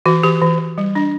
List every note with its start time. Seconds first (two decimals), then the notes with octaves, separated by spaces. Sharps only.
0.06 E3 F#4
0.23 E3 G4
0.41 E3
0.59 E3
0.78 G3
0.95 D4